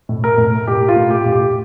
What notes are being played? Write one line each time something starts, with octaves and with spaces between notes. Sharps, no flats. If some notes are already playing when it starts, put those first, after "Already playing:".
A2
A#4
A2
A2 G4
F4
A2
G4
A2
G4